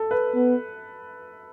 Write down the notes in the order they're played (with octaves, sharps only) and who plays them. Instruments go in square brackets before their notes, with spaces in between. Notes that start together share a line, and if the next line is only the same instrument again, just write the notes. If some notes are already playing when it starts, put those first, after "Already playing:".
Already playing: [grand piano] A4
B4
[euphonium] B3